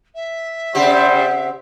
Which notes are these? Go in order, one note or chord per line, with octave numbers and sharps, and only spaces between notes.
E5
C#3 G3 C4 G4 C5 F#5